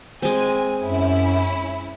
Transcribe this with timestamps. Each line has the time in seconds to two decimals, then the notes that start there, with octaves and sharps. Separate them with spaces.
0.22 G#3 C4 G#5
0.82 F#2 C#4 E4